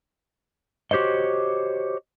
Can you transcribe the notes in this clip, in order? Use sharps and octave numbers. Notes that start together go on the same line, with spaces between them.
F#4 G4 C5 C#5 D#5